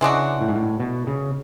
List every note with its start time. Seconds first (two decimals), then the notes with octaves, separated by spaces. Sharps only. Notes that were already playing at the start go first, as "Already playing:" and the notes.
0.01 C#3 E3 G#3 D4 F#4
0.41 A2
0.48 G#2
0.56 A2
0.80 B2
1.07 C#3